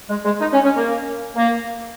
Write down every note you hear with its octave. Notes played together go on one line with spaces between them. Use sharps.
G#3
G#3
D#4
C#4
C#4
A#3
A#3